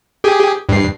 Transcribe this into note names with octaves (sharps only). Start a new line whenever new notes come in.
G4 G#4
G2 C7